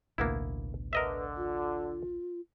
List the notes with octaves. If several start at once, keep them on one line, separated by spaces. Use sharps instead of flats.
A1 D2 B2 A#3 B3 E4
D3 A#4 B4 D#5 E5
F4